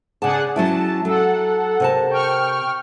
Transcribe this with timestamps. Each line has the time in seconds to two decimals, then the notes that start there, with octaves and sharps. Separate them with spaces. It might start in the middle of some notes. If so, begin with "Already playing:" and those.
0.22 C#3 G#4 D5 F#5 A5
0.56 F#3 C#4 E4 A5
1.05 F#3 A4 F#5
1.80 C3 A#4 A5
2.09 G5 C#6 F6